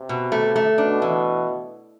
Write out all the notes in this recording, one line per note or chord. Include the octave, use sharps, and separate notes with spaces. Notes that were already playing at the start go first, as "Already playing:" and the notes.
Already playing: C3
B2
A3
A3
B2 D4
E3